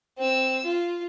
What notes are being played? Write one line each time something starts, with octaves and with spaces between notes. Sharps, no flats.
C4 E6
F4